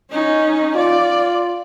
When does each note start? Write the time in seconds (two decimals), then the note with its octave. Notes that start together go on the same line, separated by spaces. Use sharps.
0.11 C#4 D#4
0.76 F4 D5